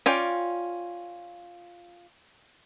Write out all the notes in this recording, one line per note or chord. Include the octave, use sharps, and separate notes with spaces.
C#4 F4 D5 G5